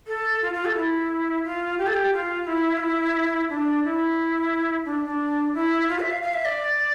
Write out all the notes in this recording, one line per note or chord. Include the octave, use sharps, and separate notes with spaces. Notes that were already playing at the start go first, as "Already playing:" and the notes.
A4
F4
F4
A4
E4
F4
G4
A4
G4
F4
E4
F4
E4
D4
E4
D4
D4
E4
F4
E5
F5
F5
E5
D5